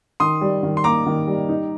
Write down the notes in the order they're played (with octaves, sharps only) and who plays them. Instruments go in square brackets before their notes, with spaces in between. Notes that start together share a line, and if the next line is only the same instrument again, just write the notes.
[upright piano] D#3 [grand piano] C6 D#6
[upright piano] G3
D#3
[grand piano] C6
[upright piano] A#3 [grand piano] A#5 D6
[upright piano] D#3
G3
D#4